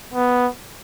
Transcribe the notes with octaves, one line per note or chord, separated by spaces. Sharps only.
B3